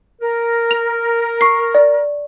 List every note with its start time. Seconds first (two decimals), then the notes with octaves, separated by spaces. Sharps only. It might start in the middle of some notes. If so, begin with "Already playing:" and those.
0.22 A#4
0.71 F7
1.41 C#6 C7
1.75 D5